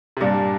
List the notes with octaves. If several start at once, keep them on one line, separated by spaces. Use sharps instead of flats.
C3
G2 A#2 G4 D5 F5 A5